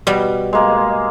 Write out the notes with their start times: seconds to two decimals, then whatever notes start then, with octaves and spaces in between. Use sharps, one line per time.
0.07 B2 G3
0.53 G#3 A#3